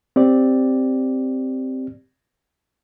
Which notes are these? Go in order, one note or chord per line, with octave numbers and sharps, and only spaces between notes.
C4 G4 D5